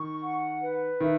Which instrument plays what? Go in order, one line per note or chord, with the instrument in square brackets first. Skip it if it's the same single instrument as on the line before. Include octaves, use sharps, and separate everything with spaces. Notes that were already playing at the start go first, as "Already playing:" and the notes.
Already playing: [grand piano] D#3 [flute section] C#6
[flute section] F#5
B4
[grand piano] D#3 [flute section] E5